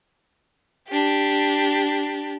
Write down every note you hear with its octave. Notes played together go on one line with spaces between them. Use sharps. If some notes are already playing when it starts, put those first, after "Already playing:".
D4 G4